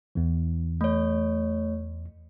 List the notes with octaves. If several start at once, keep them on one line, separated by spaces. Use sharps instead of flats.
E2 E3
A3 C#5